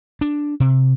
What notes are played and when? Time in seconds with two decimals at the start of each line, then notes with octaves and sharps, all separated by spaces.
0.21 D4
0.60 C3